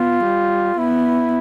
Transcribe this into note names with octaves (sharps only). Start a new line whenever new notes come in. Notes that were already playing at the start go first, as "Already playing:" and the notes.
Already playing: B3 F4
G3
B3 E4